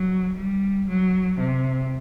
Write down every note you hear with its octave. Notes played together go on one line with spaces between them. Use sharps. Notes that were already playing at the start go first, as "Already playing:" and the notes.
Already playing: F#3
G3
F#3
C3